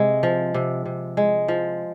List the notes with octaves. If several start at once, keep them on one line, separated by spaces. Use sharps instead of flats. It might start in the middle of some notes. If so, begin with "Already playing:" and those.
Already playing: C3 G#3
F3
C3
C3
G#3
F3